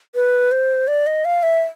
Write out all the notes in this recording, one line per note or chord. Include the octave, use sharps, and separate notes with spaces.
B4
C5
D5
D#5
F5
E5